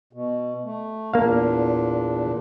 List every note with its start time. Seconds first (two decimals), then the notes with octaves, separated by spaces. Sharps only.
0.13 B2
0.64 A3
1.13 E2 A#2 A#3 D4 F5